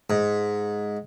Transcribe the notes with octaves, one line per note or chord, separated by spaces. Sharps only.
G#2